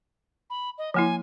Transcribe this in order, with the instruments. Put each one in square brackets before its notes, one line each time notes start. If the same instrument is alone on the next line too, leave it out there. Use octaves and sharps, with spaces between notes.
[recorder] B5
D#5
[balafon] F3 A#3 E4 [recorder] G#5